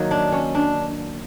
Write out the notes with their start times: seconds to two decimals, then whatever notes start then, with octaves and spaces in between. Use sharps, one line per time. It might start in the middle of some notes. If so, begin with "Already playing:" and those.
Already playing: D#3 F#3 A#3
0.11 D4
0.32 C#4
0.55 D4